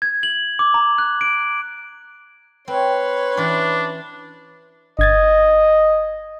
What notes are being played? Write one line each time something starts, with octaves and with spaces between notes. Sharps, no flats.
G#6
F#7
D6
A#5
F#6
D7
C4 B4 C#5 C6
E3 C#4 D4
G1 D#5 G#6 A6